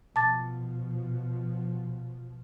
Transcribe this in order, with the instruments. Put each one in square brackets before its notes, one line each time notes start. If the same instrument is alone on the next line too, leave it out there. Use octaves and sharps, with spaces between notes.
[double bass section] B2 F3 [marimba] A5 D6 A6